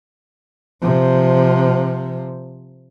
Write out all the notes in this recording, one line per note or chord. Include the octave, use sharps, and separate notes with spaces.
C3 F3